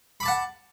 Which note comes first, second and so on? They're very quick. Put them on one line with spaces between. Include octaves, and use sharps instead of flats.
B5 D6 A5 F#5